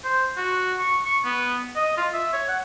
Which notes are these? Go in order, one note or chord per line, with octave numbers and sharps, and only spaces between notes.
C5
F#4
C#6
C#6
B3
D#5
F4
E5
C#5
F#5